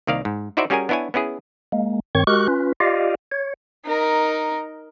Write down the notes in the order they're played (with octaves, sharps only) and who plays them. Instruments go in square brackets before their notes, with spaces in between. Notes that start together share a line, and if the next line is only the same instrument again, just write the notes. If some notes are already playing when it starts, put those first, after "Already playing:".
[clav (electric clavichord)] C2 D#3 A#3 D5 F5
G#2
D#4 E4 F#4 C5 D5 E5
G3 C#4 F#4 G#4 A#4 G#5
B3 D4 E4 C#5 G#5
B3 C#4 E4 G#4
[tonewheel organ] G#3 A#3
G2 D#3 C4 C#5 C#6
G#3 F#4 G4 A#4 C#6 F#6
C#4 F4 B4
F4 G4 D5 D#5 F5
C#5
[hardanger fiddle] D#4 A#4